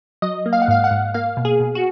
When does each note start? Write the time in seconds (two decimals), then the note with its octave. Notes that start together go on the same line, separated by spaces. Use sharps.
0.22 F#3 D#5
0.46 A#3
0.53 F5
0.62 F#5
0.68 G#2 F5
0.84 F#5
0.91 G#2
1.14 A#3 F5
1.37 B2
1.45 G#4
1.60 B2
1.75 F#4